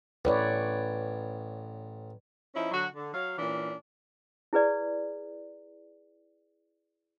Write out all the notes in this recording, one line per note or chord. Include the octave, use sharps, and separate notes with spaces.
A1 B4 C#5 D5
F3 C#4 D#4 E4
D3 F#3 F#4
D3
F#3 F5
A#2 E3 C#4 D4
E4 G#4 B4 D5